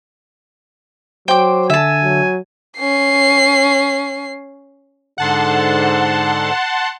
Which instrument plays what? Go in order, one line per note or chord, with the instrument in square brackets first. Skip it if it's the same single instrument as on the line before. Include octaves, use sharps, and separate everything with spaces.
[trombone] F#3 [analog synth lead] C5 [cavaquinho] G5 D6
[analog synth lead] D3 [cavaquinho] E5 A5 [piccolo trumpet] G#5
[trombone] F#3
[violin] C#4 C7
[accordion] G#2 D3 [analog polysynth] F#5 A5 C6